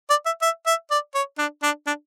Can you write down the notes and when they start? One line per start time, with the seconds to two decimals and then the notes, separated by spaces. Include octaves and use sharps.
0.10 D5
0.26 E5
0.42 E5
0.66 E5
0.90 D5
1.15 C#5
1.38 D4
1.63 D4
1.87 D4